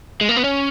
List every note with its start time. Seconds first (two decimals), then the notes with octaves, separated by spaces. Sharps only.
0.21 G#3
0.29 A#3
0.37 B3
0.44 C#4